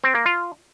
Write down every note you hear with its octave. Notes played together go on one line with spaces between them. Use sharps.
C4
A#3
F4